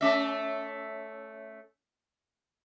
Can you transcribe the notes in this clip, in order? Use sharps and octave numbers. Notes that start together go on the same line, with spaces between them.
A3 C#4 E5